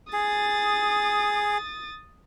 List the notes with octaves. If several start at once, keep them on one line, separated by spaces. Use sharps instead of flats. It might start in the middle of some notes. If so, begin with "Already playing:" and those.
G#4 D#6 A6